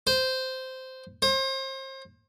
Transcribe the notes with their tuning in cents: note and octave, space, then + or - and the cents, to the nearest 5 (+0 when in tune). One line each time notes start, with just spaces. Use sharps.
C5 -10
C5 +35